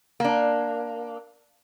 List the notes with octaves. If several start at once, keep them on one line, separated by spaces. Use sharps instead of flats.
A#3 D4